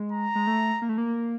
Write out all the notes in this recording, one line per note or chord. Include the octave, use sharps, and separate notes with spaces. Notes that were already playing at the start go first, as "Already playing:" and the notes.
Already playing: G#3
A#5
G#3
A3
A#3
A3
A#3